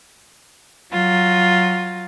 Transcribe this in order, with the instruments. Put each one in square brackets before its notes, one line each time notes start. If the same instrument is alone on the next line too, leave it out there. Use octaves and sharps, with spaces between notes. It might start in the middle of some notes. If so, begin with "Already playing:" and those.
[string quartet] F#3 F4